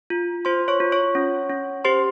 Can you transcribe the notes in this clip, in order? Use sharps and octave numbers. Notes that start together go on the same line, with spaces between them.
F4
F4 C5 C6
C#5 C#6
F4
C#5 C#6
C#4
C#4
G4 C5 C6